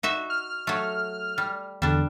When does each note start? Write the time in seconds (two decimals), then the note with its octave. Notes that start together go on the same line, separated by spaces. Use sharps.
0.03 D#4 F#4 E5
0.30 F6
0.67 F#3 A3
1.38 G3
1.82 E2 D3 G3 D4